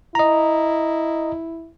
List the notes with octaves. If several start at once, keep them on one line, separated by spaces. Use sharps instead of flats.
E4 D#5 A#5